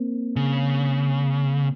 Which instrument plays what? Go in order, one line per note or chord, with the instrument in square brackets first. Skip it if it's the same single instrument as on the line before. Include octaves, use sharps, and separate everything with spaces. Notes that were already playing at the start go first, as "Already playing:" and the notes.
Already playing: [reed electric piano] A#3 C4
[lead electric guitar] C#3